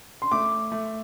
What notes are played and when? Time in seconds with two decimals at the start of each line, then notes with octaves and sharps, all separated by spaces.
0.22 C6
0.32 A3 D6
0.72 A3